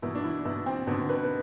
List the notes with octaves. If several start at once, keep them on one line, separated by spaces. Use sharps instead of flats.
B2 E3 E4
D4
E3 E4
B2 E3 E4
C4
B2 D3 D4
B3 B4
B4